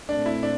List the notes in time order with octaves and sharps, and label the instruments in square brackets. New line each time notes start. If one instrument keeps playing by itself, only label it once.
[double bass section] A#2 A3 C4 [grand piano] D4
[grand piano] E4
D4